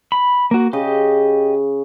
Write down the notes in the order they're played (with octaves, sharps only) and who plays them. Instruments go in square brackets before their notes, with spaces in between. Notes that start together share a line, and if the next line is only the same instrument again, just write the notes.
[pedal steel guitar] B5
A#3 F#4
[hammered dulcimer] C#3 [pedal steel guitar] G4 D#5